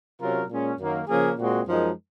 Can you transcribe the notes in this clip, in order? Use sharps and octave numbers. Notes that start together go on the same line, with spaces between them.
C3 F#3 C#4 F4 A#4
A#2 G#3 C#4
F#2 D#3 F#3 A#3
C#3 F3 A#3 C#4 G#4
A#2 G#3 C4 F#4
F#2 F3 G#3 D#4 A#4